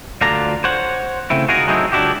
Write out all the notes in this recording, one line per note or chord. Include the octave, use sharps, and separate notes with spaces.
D2 D3 D4 F4 A#5
C5 C#5 F#5
C#3 A3 C4 E4
D#4 F4 F#4 G#4 A#4
F#3 G#3 A3 C4 D#4 E4
C#2 F#2 D4 E4 F#4 G4